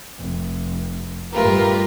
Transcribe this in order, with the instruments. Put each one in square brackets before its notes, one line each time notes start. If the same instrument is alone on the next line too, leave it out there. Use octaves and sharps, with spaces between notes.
[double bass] F1
[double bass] G2 A3 [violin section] F4 G4 B4 [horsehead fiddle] A#4